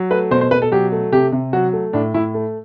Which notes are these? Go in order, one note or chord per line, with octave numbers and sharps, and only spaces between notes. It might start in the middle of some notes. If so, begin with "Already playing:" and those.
Already playing: F#3
A3 B4
B2 C5
C5
B2 B4
A4
F#3 G4
A3
C3 G4
C3
F#3 F#4
A3
A2 D4
A2 E4
A3